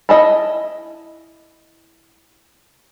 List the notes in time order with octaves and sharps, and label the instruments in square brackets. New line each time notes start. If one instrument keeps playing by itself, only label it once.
[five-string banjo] E4 D#5 A5 B5